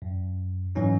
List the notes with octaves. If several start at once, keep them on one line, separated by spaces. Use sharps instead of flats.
F#2
G#2 E3 F#3 C#4 D#4